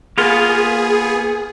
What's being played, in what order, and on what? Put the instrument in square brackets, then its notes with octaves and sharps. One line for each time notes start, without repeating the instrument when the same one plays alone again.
[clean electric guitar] A#3 B3 F4 [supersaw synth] G#4